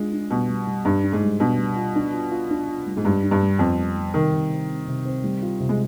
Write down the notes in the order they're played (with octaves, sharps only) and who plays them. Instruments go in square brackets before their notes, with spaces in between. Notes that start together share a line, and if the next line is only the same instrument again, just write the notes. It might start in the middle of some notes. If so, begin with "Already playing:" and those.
Already playing: [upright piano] G#3 [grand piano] D4 F4
[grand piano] D4
[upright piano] B2 [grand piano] G3
[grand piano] G3
G3
[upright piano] G2 [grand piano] D4
[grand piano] D4
[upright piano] G#2
[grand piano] G3
[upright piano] B2 [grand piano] D4
[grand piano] G3
F4
D4
F4
F4
D4
F4
G3
[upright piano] G#2
[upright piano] G2 [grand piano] G3
[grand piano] D4
[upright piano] G2
[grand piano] G3
[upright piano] F2 [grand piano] B3
[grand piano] G3
G3
[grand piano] C3 [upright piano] D#3
[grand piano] C3
C4
C4
C3
C4
G3
F4
C3
[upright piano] G#3